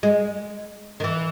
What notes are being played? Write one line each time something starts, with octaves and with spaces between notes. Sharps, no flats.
G#3
D#3
E3